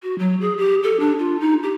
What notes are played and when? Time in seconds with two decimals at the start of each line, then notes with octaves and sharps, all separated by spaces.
0.03 F#4
0.19 F#3
0.41 G#4
0.58 G4
0.83 A4
1.00 D4
1.19 F4
1.40 D#4
1.63 G4